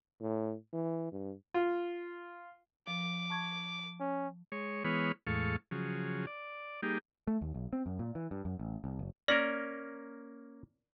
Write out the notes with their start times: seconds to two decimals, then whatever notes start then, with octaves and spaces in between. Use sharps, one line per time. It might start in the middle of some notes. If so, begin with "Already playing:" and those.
0.21 A2
0.73 E3
1.12 G2
1.54 F4
2.87 F3 D6
3.30 A5 C#6 G#6
4.00 C#4
4.52 G#3 C#5
4.85 E3 G#3 B3 C#5 B5 F6
5.27 E2 A2 G#3 A4 F5 C#6
5.71 C#3 F3 F#3 G#4
6.27 D5
6.83 G3 A#3 D#4 G4 G#4
7.27 A3
7.41 D#2
7.54 B1
7.73 C4
7.86 F#2
7.99 A#2
8.15 E3
8.31 G2
8.45 F#2
8.60 A1
8.84 C2
8.99 F#1
9.28 A#3 C#4 A#4 D5 A#6 F#7